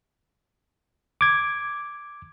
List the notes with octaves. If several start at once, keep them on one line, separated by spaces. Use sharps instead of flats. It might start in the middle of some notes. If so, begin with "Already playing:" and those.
D6 G#6